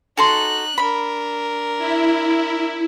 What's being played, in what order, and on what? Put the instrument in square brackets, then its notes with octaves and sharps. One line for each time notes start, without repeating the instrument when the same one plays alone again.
[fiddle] D#4 F#6 [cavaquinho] F#4 A4 C6
[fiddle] D4 A#4 [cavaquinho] B5
[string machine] E4